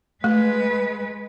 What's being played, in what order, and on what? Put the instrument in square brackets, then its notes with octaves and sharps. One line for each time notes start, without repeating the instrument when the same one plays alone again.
[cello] G#3 B4 [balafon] A3